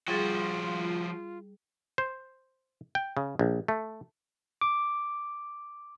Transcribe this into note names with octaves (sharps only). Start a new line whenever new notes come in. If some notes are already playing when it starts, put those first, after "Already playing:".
F3 G3 F4 F#4 G#4 A6
C5
G5
C#3
A#1
A3
D6